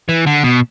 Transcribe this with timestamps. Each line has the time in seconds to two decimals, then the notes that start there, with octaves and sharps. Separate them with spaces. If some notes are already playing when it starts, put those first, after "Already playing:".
0.09 E3
0.26 D3
0.44 B2